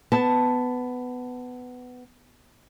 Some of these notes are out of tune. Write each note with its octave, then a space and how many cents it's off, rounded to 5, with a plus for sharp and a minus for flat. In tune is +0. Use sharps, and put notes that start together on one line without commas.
B3 +15 A5 +0